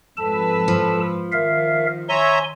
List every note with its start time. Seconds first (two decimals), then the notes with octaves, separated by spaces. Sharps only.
0.17 F2 G#2 A4 B4 A5
0.68 F3
1.32 D#3 A#4 E5 F5
2.09 C#5 E5 G#5 A#5 C6